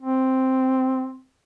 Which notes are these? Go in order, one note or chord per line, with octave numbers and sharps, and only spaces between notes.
C4